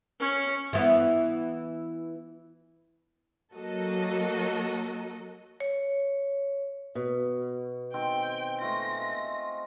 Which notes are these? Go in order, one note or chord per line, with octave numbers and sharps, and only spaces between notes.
C#4
E3 B3
F#3 A#3 F#4 A4 A#4 D#5
C#5
B2
D#3 G#3 C4 G5
G#3 A3 F4 A#6